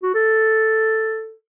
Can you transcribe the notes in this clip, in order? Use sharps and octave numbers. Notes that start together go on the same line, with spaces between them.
F#4
A4